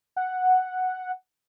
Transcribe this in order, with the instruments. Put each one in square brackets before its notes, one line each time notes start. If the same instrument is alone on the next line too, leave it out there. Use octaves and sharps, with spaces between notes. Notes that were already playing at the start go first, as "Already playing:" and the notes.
[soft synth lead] F#5